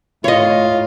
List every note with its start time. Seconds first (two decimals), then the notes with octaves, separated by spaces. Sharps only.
0.24 A2 F4 C#5 D#5